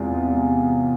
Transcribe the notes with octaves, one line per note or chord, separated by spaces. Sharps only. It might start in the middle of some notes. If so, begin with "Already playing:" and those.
Already playing: E2 C3 G#3 F4